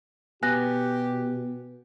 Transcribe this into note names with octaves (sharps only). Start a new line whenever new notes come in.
B2 B3 G4 G#5 F#6 A#6